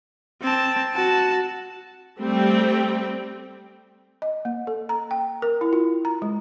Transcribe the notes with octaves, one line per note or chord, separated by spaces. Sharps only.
C4 A5
F#4 A5
G3 A3 C4 G5
D#5
A#3
A4
A#5
G5
A#4
E4
F4
A#5
G#3